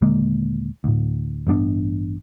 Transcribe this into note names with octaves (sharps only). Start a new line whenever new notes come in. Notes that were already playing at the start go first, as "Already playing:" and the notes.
D#1 D3 G#3 A#3
D2 A2
A1 G2 B3 D4